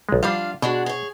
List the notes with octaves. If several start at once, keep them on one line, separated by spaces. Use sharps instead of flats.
B1 G#3
F3 G3 D4 F4 F5
B2 G#3 D4 F#4
G#4 C#5